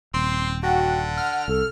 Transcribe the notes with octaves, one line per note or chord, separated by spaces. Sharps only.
D#1 C4 C6
D3 F#4 G5
F#5 F6
C2 A4